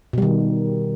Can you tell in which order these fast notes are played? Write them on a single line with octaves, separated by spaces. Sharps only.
B2 G3 D#3